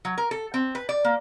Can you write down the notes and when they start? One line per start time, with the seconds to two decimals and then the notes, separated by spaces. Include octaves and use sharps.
0.05 F#3
0.18 A#4
0.31 A4
0.54 C4
0.75 B4
0.89 D5
1.04 A#3